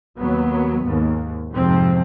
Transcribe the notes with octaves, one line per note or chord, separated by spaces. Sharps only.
D#2 F#3 B3
D#2 G#2
F2 G#2 C3 F3 C4